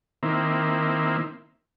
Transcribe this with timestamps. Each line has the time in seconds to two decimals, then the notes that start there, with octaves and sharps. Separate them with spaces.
0.23 D#3 A#3 C4 E4